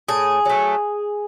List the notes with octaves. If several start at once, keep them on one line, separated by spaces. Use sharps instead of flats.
A2 G#4
F#3 A3